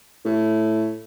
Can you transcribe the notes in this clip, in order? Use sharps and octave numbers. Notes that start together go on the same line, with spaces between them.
A2